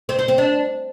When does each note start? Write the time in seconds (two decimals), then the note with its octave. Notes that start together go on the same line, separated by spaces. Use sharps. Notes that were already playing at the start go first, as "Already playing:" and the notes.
0.09 C4
0.19 C5
0.28 C4
0.38 D4